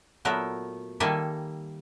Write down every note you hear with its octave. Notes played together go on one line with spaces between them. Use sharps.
A#2 F#3 A3 B3 A#4 E5
D#3 G3 A#3 A4 E5 G#5